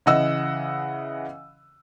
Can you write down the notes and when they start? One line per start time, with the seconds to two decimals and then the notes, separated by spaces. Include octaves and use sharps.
0.06 C#3 E3 D#5 F#5 E6